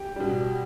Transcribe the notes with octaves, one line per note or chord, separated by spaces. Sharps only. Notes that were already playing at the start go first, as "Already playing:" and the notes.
Already playing: G4
B2 G3